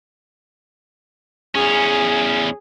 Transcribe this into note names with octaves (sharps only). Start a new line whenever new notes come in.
E2 C#4 G#4